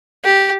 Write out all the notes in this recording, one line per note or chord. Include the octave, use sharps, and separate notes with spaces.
G4